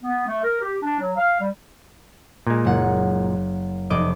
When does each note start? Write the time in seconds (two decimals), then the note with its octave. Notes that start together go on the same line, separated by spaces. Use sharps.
0.03 B3
0.27 A3
0.44 A#4
0.61 G4
0.83 D4
0.99 F#3
1.17 F5
1.41 G3
2.47 A#2 G#3
2.65 F#1 F#5
3.90 F1 D5 D#5 D6